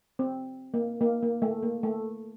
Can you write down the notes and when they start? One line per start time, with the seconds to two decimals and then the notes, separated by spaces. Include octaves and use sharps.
0.19 C4
0.74 A#3
1.01 A#3
1.22 A#3
1.42 A3
1.63 A#3
1.83 A3